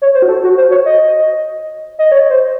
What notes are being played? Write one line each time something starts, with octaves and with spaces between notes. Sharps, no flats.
C#5
C5
F#4
A4
F#4
C5
C#5
D#5
D#5
C#5
C5